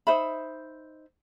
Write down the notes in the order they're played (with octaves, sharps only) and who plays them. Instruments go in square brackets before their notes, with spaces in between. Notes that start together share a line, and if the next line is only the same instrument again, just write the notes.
[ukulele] D#4 C5 E5 B5